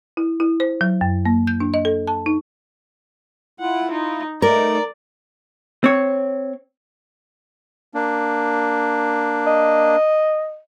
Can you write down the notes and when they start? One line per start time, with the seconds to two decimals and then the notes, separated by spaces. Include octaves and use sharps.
0.17 E4
0.40 E4
0.60 C5
0.81 F#3
1.01 F#2
1.26 A#3
1.47 G6
1.60 D4
1.74 D#5
1.85 A4
2.07 A5
2.26 D#4
3.60 E4 F4 F#5
3.91 D#4
4.42 A3 D#4 A#4 D5
5.84 C4 C#5
7.94 A#3 D4
9.47 D#5